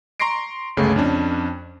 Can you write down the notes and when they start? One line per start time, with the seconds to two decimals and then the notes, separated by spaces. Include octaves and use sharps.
0.20 A#5 C6 C#6 A#6 C7 D7
0.77 G1 C#2 C#3 A3
0.96 F2 C#4 D4